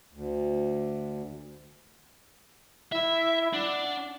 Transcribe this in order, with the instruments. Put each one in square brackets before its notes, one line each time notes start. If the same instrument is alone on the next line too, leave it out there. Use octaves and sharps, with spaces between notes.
[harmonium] D2
[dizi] E4 [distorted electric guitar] E5
[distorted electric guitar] D4 [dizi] F#5